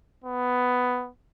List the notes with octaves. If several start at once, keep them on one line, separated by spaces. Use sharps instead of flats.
B3